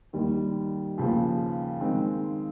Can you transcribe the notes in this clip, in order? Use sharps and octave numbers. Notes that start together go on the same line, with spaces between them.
D#2 D#3 G3
D#2 C#3 F3
D#3 G#3 C4